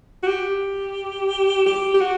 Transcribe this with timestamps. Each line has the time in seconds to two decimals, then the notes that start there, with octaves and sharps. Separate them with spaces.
0.23 F#4
0.28 G4
1.66 G4
1.94 G4
2.01 F#4